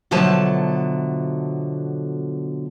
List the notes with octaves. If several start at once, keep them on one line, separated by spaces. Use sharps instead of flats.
B2 D3 F3 F#3 A3 A5